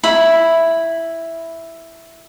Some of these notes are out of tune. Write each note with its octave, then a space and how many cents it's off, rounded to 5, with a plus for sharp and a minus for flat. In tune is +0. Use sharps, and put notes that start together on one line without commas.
E4 +0 B5 +0